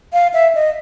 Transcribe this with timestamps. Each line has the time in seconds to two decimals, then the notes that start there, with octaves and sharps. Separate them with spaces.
0.13 F5
0.34 E5
0.55 D#5